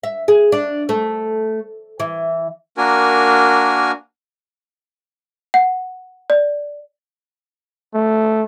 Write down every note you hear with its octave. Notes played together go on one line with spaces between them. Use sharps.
E5
G#4
D4
A3
E3
A#3 D4 F#4 A#4 G#5
F#5
D5
A3